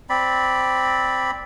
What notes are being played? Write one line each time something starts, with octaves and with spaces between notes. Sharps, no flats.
C4 D5 B5